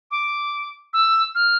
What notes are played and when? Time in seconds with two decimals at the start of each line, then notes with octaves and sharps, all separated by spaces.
0.11 D6
0.93 E6
1.35 F6